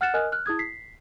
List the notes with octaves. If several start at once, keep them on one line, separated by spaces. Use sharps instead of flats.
F#5 F6 F#6 A6 C#7 E7
A#4 D#5 G#5 F6 F#6
F6 F#6
E4 G#4 D#6 G#6
B6 C7